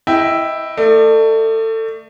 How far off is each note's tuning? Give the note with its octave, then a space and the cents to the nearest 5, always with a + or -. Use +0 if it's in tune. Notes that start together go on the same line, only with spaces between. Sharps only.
E4 +0 D#5 +20 G5 +0
A3 +25 D5 +40